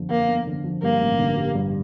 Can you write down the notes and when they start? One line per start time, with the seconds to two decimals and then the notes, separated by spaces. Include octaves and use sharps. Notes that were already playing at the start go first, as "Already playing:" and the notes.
Already playing: G1 F2 D3 F3
0.10 F2 A#3
0.28 G1
0.47 D3
0.64 F3
0.82 G2 A#3
1.01 A1
1.19 D3
1.37 G3
1.55 G2